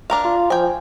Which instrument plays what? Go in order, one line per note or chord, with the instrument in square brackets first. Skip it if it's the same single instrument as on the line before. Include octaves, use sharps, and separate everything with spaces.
[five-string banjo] D4 A#4 F5
[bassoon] F4
[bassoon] F3 [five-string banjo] G5 G#5